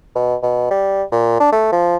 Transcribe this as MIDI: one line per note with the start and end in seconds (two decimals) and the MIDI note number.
0.15 0.36 47
0.43 0.66 47
0.70 1.03 55
1.12 1.37 46
1.40 1.52 62
1.52 1.72 57
1.72 1.97 53